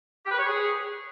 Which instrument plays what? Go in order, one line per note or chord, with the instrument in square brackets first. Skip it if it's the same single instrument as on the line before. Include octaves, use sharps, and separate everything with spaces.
[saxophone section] G4
B4
C#5
G#4